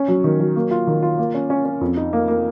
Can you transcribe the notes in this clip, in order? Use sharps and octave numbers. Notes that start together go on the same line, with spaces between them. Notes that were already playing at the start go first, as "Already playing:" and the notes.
Already playing: C#4
F#3
D#3
F#3
A#3
F4
D#3
F4
A#3
C#4
C#4
C#4
F2
D#4
A#3
A#3